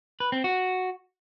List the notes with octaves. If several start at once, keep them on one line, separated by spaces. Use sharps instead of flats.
B4
C4
F#4